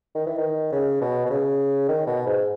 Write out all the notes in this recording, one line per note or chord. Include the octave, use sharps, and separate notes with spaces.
D#3
E3
D#3
C#3
B2
B2
C#3
D#3
B2
G#2